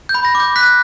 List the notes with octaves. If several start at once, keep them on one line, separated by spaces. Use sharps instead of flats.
G6
B5
A#6
D6
G6
F#6 B6